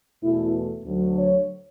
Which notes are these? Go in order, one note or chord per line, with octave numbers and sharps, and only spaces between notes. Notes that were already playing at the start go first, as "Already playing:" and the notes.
E2 B2 A3 E4
D2 D3 F#3
C#5